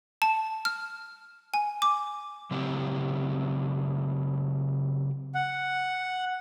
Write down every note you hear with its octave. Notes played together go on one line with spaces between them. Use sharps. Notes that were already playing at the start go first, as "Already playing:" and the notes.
A5
F6
G#5
D6
C#3 F#3 C4 E4 G4
F#5